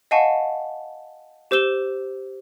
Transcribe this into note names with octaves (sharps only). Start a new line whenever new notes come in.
D#5 F5 F#5 G#5 A5 C#6
G4 C5 E6 E7 G7